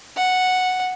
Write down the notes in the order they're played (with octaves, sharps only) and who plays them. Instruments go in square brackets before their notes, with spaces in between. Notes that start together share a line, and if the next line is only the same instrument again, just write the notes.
[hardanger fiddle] F#5